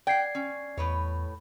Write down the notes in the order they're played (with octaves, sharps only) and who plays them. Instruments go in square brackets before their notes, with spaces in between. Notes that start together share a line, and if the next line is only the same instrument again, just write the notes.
[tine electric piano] D5 G#6 C7 [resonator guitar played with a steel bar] F#5 G5
[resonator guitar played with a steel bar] C#4
[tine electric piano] E2 [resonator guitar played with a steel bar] A2 B4 C#5